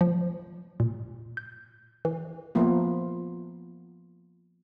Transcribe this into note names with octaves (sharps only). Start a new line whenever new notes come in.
F3
A#2
G6
E3
F3 A#3 B3 F4